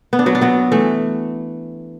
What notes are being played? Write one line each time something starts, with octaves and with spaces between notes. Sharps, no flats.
B3
D4
F#3 B3
D4
F#3 B3
E3 A3